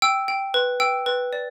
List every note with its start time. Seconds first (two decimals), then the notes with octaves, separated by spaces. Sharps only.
0.02 G5 E6
0.28 G5
0.54 B4
0.80 G5 E6
1.06 B4
1.33 D5